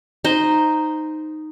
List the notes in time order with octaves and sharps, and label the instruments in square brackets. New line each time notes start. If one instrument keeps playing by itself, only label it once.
[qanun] D#4 C5